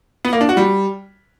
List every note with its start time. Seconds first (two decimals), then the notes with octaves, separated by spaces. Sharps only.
0.25 B3
0.33 A#3
0.41 D4
0.49 F#4
0.57 G3